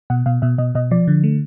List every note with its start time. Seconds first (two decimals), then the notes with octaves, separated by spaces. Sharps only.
0.10 B2 F#5
0.26 B2 F5
0.42 B2 E5
0.58 B2 D#5
0.75 B2 D#5
0.91 F3 D5
1.08 D3
1.24 A3